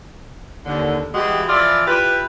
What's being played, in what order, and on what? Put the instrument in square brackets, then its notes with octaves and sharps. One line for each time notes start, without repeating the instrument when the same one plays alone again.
[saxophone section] D#2 D3
E3 G3 G#3 F#4 G4
E3 F3 F4 D5 E5
E4 F4 G4 B4